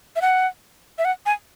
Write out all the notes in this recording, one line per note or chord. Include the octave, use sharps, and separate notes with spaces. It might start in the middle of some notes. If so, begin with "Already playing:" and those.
E5
F#5
E5
F#5
G#5